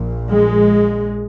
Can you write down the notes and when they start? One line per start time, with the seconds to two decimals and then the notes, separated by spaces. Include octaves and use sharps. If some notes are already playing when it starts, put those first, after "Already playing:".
Already playing: A#1 A#2
0.28 G#3